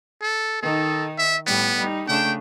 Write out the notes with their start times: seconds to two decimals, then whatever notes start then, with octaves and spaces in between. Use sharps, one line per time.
0.22 A4
0.62 D#3 D#4 A4
1.18 E5
1.47 A2 G3 B3
1.78 G3 D#4
2.08 C#3 A3 D4 G5